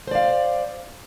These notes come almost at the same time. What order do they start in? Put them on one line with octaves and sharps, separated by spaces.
C5 D5 F5